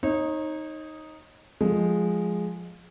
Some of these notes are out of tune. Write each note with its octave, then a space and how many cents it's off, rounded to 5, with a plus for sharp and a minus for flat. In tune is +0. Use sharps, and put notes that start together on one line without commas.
D#4 +0 C#5 -35
F3 +10 G#3 +0